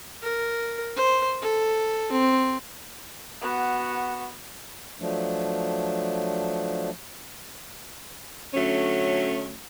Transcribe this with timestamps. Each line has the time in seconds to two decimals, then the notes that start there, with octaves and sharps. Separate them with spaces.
0.22 A#4
0.96 C5
1.42 A4
2.12 C4
3.42 B3 F#4
5.00 F3 F#3 A3 D4
8.54 D3 F#3 A3 C#4